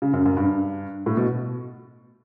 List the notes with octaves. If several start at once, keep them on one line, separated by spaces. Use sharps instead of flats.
C#3
F#2
F#2
G2
A2
B2